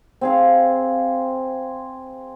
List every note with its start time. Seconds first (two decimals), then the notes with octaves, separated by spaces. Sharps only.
0.21 C4 G#4 F5